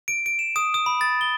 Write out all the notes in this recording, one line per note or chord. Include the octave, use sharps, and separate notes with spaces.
D7
D7
E7
D#6
D#6
B5
A6
G7